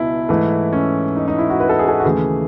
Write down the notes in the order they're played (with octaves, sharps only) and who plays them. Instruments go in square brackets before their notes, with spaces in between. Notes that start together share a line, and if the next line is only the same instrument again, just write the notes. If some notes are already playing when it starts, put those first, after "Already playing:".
Already playing: [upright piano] C#2 B2 F#3 E4
G#2 E3 A3
C#4
D#4
D#4
E4
F#4
B4
A4
G#4
A4
F#4
D#2 C#3 E3 A3 G#4